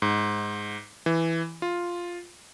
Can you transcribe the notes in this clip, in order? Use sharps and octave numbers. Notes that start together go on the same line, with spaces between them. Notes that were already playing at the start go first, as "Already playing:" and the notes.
G#2
E3
F4